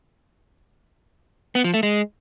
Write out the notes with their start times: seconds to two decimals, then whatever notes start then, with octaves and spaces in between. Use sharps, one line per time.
1.55 B3
1.64 F3
1.74 A3
1.83 G#3